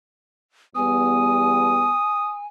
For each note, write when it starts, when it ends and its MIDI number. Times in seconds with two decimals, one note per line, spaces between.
0.76 1.91 40
0.76 1.91 55
0.76 1.91 59
0.76 2.47 80
0.76 2.37 87